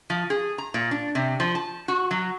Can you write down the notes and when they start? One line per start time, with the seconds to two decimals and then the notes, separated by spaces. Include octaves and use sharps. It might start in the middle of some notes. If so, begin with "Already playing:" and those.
0.10 F3
0.30 G#4
0.58 A#5
0.74 A#2
0.91 D4
1.15 C3
1.40 F3
1.55 A5
1.88 F#4
2.11 F#3